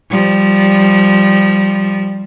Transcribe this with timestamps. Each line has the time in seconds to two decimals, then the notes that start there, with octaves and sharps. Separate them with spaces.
0.10 F3 G3